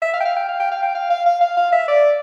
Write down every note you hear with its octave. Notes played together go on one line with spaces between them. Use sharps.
E5
F5
G5
F5
G5
F5
G5
F5
G5
F5
F5
F5
F5
F5
E5
D5